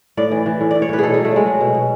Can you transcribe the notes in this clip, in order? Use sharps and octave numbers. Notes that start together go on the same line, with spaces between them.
A2 D5
E3
E3
A2
A2 D5
C#5
A2 B4
B2 G#4 A4
F#3 G#4
A3
F#3 G#3
F#3
B2
B2